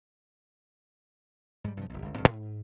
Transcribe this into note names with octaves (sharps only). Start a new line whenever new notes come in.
G#2 G3
G2 C3 D#3 F3
F1 B1
G1 C#2
D#1 G2 E3 C4
G#2